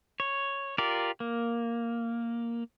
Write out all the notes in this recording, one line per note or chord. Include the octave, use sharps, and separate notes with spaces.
C#5
F4 G4 A#4 D5
A#3